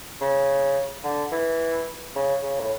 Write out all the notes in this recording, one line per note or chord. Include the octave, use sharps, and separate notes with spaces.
C#3
D3
E3
C#3
C#3
A2